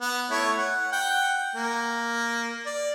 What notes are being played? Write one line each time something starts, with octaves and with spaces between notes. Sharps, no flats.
B3
A3 E4 C#5
F#5
F#5 G5
A#3
D5